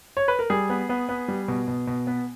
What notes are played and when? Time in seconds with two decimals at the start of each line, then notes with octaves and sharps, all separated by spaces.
0.17 C#5
0.28 B4
0.39 A#4
0.50 G3 G#4
0.69 B3
0.89 B3
1.09 B3
1.28 G3
1.48 B2
1.68 B2
1.87 B2
2.07 B3